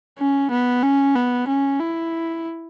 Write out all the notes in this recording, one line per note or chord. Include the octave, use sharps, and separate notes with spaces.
C#4
B3
C#4
B3
C#4
E4